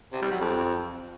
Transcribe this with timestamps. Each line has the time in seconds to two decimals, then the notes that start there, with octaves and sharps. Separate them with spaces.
0.13 C3
0.22 G3
0.31 F#3
0.40 F2